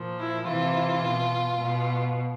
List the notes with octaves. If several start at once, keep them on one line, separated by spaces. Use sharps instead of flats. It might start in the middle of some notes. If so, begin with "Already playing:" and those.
Already playing: A#2 F3
E4
C3 E3 F4
B2
B2